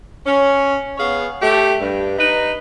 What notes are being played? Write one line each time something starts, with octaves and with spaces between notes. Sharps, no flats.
C#4
B3 G#4 C#5 F5
A3 G4
G2
D#4 B4